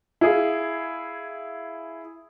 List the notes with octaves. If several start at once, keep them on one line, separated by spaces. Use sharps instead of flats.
E4 G#4 F5